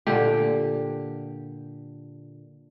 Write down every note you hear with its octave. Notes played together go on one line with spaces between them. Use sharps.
A#2 D3 G4